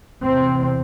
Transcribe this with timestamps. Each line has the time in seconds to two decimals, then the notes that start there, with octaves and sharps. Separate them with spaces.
0.24 E2 C3 C4